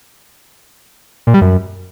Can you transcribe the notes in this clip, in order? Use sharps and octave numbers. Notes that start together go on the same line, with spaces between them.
A#2
G3
F#2